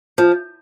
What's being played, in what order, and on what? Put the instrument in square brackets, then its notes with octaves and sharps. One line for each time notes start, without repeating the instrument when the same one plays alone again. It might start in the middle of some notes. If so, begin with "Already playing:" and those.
[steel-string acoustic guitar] F3